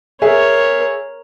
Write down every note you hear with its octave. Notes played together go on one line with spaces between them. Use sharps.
G#4 A#4 C#5 E5